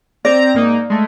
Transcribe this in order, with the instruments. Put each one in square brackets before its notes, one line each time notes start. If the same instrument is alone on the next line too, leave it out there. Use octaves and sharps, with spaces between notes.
[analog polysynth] C4 A#5 [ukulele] D5
[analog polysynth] G#2 A#3 D#4
G#3 A3